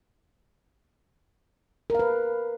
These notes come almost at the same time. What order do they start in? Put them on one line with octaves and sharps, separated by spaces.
A#4 F5 B4